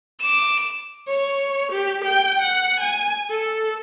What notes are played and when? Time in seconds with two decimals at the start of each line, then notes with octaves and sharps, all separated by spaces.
0.20 D6 E7
1.08 C#5
1.72 G4
2.05 G5
2.42 F#5
2.80 G#5
3.30 A4